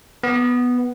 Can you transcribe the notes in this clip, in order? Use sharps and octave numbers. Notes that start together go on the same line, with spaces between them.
B3